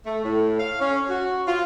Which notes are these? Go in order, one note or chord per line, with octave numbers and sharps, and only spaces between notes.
A3
A2
F5
C#4
F#4
F4